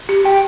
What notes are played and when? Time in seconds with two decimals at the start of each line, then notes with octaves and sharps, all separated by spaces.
0.09 G4
0.24 G4 G5